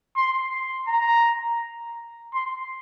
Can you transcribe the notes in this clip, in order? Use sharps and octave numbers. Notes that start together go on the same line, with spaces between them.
C6
A#5
C6